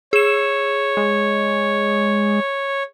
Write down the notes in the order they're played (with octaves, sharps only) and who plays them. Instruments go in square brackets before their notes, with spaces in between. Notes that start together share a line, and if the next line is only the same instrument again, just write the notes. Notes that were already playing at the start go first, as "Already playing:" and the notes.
[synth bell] G#4 E7 [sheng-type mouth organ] C#5
[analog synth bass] G#3